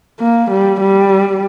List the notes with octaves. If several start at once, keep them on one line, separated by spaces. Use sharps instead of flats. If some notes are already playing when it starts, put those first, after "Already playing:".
A#3
G3
G3